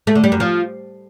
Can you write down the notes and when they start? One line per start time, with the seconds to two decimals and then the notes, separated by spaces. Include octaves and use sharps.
0.07 A3
0.15 D3
0.24 G3
0.32 F#2
0.40 F3